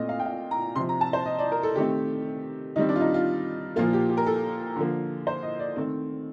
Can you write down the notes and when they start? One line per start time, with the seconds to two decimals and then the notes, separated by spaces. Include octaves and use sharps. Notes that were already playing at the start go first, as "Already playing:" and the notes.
Already playing: A#2 A3 C4 D#5
0.09 F5
0.20 G5
0.26 F5
0.51 A#5
0.76 C3 F3 C4 C6
0.89 A#5
1.01 A5
1.13 C5
1.26 D#5
1.39 D5
1.52 A#4
1.63 A4
1.76 D#3 A3 C4 G4
2.76 D#3 G3 C4 D#4
2.89 D4
2.96 F4
3.01 D#4
3.14 F4
3.76 A#2 F3 A#3 F4
3.93 G4
4.09 G4
4.17 A#4
4.27 A4
4.76 D3 F3 A#3
5.27 C5
5.43 D#5
5.59 D5
5.76 D#3 A3 C4